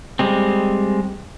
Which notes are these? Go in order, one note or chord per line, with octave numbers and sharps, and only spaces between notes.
G3 G#3 C4